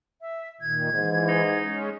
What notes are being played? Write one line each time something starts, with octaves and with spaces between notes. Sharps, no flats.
E5
A#2 D#3 G#6
G#2 E3
D#4
G#3 C#4